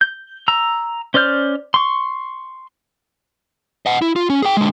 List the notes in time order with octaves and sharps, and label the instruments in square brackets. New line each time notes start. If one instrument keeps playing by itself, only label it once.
[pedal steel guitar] G6
A#5 E6
C#4 C5 D5 F6 G6
C6 C#6
[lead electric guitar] D#5 F#5
E4
F4
C#4
G#4 G5
D3 G#3